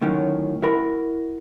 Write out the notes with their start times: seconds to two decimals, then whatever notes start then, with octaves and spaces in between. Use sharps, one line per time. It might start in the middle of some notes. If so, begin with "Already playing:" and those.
0.01 D2 A2 D#3 F#3 C#4
0.62 E4 F#4 A#4 B5